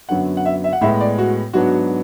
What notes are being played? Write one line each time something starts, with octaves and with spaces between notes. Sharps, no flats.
F#2 D3 F#3 B3 F#5
F#5
E5
E5
F#5
A2 G#3 B3 E5
D5
F#4
G#2 F#3 B3 D4 F#4